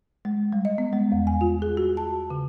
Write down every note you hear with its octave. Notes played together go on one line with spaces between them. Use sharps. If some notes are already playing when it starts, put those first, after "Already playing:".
G#3
G3
D#5
B3
G#3
E2
G#5
F4
G#4
F#4
A5
C#3